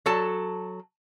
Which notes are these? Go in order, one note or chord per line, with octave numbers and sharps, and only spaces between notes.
F#3 A4 A5